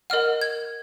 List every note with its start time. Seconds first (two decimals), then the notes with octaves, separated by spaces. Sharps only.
0.10 A#4 D#5 F#5 F6
0.41 G#6